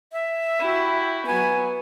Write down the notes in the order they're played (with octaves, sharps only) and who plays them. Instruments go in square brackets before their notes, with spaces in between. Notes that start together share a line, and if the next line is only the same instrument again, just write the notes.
[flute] E5
[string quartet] E4 F#4 G4
[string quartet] F#3 B3 [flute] G#5